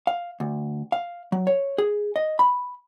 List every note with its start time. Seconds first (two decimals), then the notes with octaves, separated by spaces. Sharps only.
0.07 F5
0.40 D2
0.92 F5
1.32 F#3
1.47 C#5
1.78 G#4
2.16 D#5
2.39 B5